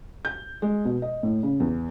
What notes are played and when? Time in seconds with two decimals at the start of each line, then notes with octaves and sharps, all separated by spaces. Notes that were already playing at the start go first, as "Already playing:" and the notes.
0.25 G6
0.62 G#3
0.85 B2
1.02 D#5
1.23 A2
1.43 C#3
1.60 E2